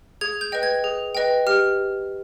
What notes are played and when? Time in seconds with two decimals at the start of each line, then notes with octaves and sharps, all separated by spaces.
0.21 G#4 G#6
0.41 G6
0.52 B4 D#5 G5
0.63 G#6
0.84 G#4
1.15 B4 D#5 G5
1.47 G4 F6